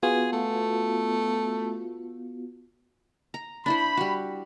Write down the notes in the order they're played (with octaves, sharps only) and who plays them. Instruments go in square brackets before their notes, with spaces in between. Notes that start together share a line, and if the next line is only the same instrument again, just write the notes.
[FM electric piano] B3 F4 F#4 [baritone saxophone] G#4
[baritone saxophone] A3
[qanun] A#5
[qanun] D4 E4 C5 [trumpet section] B5
[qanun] G3 F#4